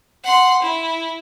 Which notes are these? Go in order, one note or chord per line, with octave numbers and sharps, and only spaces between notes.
F#5 C6
E4